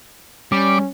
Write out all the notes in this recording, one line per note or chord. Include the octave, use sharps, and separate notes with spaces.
G3 C#4 D6